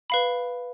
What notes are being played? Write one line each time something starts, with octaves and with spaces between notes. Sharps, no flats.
B4 F5 B5